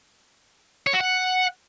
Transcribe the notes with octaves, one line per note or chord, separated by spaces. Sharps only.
C#5
F#4
F#5